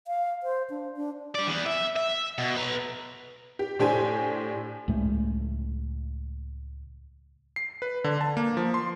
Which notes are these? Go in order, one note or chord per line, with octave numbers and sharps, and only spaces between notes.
F5
C5
D4
D4
G4 D5
E3 B3
E5
E5
B2
B4 A#5
G4
A2 D4 G4 C5 G#5
C#2 A2 G#3 A3
C7
B4
D3
A5
A#3
F3
C6